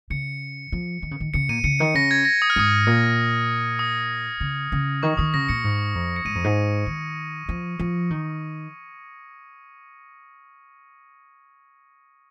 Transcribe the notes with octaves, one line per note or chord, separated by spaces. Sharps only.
C#3 C#7
F3
D#3
C#3
D#3
C#3 C#7
A#2 D#7
C#3 C#7
D#3 C#7
C#3 A#6
G#6
A#6
D#6
F6
G#2 D#6
A#2
D#6
C#3
C#3
D#3 C#6
D#3 D#6
C#3 A#6
A#2 C#7
G#2
F2
C#7
G#2 D#7
F2
G#2
D#3
F3
F3
D#3